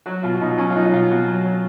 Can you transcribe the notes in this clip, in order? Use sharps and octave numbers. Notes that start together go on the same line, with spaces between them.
F#3 F#4
B2 F4
F4
B2 D#4
F#3 C#4
F4
F#3 D#4
D#4
B2 F4
B2 F#4
F#3
F#3